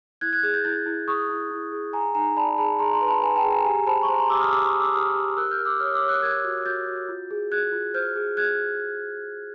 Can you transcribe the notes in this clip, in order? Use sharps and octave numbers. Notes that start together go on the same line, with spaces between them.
E4 F#6 G#6
F#6 G#6
G#4 F#6 G#6
G6 A6
E4 G6 A6
E4
G#4 C#6 D#6
E4
E4
G#4
G#4 G#5 A#5
D#4 G#5 A#5
D5 A5 B5
G#4 A5 B5
G#4 A#5 C6
A#5 C6
B4
A5 B5
B4 G#5 A#5
G5 A5
G#4
G#5 A#5
G4 G#5 A#5
C5 A5 B5
C#6
C5 A#5 C6
A#5 C6
G4 D6 E6
D#6 F6
G4 D6 E6
C#6 D#6
G4
D6 E6
G4 D#6 F6
G4
A#4 E6 F#6
F6 G6
A#4
D6 E6
C#5 D#6 F6
D6 E6
C#5
E6 F#6
A#4 F#6 G#6
F#4
F#4 G6 A6
F#4
F4
G#4
G#4 F#6 G#6
F4
C5 F6 G6
G#4
G#4 F#6 G#6